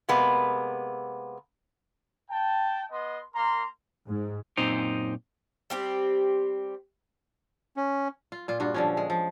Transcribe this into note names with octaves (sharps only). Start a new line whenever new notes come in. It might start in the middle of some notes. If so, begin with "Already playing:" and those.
C3 G#3 A#3 B3
G5 A5
B3 D#5 C6
A#3 A#4 A#5 C6
G#2
F#2 A#2 C4 D#4 C5
G3 C4 G4
C#4
F4
A#2 F4
G2 F4 F#4
D3 F3 C#4
G#3
F3